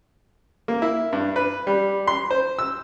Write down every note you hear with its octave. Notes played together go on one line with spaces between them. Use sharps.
A#3
E4
G2
B4
G3
C6
C5
E6